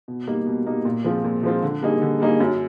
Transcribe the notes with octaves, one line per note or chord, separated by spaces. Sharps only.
B2
G3 A#3 D#4
B2
G3 A#3 D#4
A#2
F3 G#3 C4 F4
A#2
F3 G#3 C4 F4
D3
G3 A#3 D#4 G#4
D3
G3 A#3 D#4 G#4
F#2